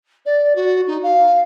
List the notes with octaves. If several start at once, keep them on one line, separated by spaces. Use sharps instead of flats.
D5
F#4
D#4
F5